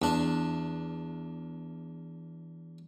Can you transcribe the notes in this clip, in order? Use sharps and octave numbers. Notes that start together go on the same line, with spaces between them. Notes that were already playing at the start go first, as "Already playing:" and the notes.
E2 D4